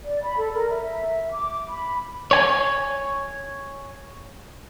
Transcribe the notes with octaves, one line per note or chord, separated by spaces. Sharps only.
D5
B5
A4
A#4
E5
D6
B5
C#5 G#5